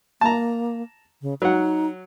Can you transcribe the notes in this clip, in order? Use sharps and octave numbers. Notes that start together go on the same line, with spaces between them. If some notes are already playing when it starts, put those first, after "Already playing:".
A#3 A5 A#5
C#3
F#3 D#4 F#5